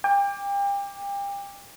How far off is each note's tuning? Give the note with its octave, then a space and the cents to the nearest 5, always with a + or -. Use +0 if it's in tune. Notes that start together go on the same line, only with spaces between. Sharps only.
G5 +35 D6 +0